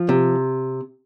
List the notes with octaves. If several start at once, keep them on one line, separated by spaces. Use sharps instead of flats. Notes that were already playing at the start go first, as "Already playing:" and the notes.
Already playing: F3
C3